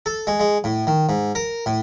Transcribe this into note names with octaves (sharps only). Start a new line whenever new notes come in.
A4
G#3
G#3
A2
D#3
G#2
A#4
A2